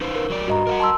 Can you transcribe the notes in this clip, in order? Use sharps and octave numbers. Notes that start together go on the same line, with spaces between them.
D#4 B4 C5
A#4
F#3 D5
G2 F#4 D#5 A#5
A#4 E5 F#5
A5 C6 E6